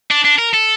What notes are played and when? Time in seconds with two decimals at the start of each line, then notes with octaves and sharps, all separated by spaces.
0.11 D4
0.24 D4
0.38 A#4
0.53 A4